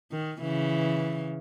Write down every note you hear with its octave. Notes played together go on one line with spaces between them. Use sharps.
D#3
C#3 E3